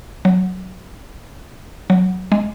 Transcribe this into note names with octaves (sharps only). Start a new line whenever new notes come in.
F#3
F#3
G#3